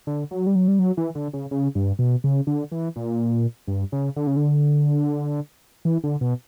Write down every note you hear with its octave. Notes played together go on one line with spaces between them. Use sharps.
D3
F#3
G3
F#3
G3
F#3
E3
D3
C#3
C#3
G2
B2
C#3
D3
E3
A#2
G2
C#3
D3
C#3
D3
E3
D3
B2